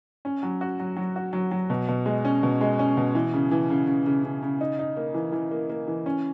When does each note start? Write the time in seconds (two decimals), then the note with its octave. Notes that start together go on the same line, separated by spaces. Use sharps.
0.25 C#4
0.43 F#3
0.61 F#4
0.80 F#3
0.97 F#3
1.16 F#4
1.33 F#3
1.51 F#3
1.70 B2
1.88 B2
2.06 G#3
2.25 C#4
2.43 B2
2.61 G#3
2.79 C#4
2.97 B2
3.15 E3
3.34 C#3
3.51 E3
3.70 C#3
3.87 C#3
4.06 C#3
4.24 C#3
4.43 C#3
4.61 D#4
4.79 D#4
4.97 A#3
5.14 E3
5.32 E3
5.51 A#3
5.70 A#3
5.88 E3
6.06 C#4